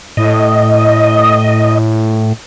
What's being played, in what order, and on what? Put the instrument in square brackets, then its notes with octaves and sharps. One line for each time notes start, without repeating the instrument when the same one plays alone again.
[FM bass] A2 [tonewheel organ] D#5